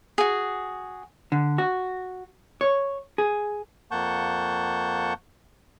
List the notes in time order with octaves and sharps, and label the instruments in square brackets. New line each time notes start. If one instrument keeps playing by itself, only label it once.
[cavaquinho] F#4 G#4
[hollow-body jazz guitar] D3
F#4
C#5
G#4
[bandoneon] F2 A#3 F#5 A5 C#6 G6